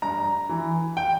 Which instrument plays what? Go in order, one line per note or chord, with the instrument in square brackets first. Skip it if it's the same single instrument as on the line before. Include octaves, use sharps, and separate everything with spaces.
[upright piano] G2 A#5
E3
G5